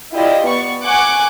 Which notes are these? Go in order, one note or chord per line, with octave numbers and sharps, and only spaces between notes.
E4 F4 G4 D5 D#5
B3 D5 C#6
F#5 G#5 C#6 D6 F#6